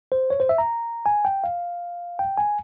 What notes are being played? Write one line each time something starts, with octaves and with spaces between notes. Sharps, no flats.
C5
C#5
C5
E5
A#5
G#5
G5
F5
G5
G#5